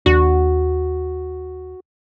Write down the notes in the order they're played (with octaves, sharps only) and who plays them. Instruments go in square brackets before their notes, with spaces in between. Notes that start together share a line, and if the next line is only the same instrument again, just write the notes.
[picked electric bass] D#2 D4 [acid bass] F#4